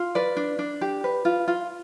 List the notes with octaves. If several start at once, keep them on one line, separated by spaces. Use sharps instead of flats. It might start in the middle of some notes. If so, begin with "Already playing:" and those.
Already playing: F4
B4 D5
D4
D4
G4
B4
F4
F4